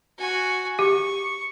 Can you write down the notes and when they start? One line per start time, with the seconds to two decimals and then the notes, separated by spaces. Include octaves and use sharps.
0.18 F#4 G#5
0.79 G4 C#6